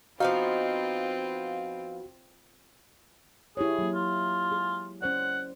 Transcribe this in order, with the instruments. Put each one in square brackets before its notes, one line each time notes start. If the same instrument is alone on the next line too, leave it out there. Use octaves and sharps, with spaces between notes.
[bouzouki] F3 B3 D#4 [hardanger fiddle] C4 F4 [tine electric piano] F#4 [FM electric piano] F5
[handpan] E4 G4 C#5 [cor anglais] G#4
[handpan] F#3 A#3
[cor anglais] F4
[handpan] G#4
[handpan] C#4 C5 D5 [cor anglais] F#5